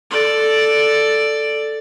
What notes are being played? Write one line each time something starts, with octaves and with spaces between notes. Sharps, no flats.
A4 D5